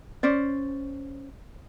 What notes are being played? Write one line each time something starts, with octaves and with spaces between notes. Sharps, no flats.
C#4 C5 D5